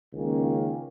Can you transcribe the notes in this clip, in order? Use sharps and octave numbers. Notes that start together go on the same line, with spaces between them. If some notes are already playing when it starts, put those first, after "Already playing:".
C#2 D#3 A#3 C#4